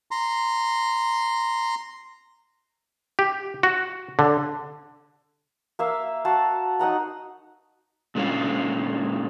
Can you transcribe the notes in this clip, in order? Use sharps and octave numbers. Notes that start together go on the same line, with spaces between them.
A#5 C6
G4
F#4
D3
A#3 E5 F5
F#4 F5 F#5 A5
D#4 D#5 F#5 A#5
A#2 D3 G#3 A#3 C#4 F4